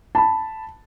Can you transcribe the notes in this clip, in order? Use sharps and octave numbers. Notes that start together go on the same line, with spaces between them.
A5 B5